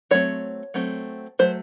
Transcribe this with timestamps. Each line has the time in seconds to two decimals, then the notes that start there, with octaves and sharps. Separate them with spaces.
0.11 F#3 A3 C4 C#5
0.74 F#3 A3 C4
1.39 F#3 A3 C5